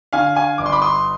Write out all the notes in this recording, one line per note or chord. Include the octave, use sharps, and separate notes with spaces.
D3 F5 G#5
F5 G#5
G1 D6
C6
B5 D6
C6 D#6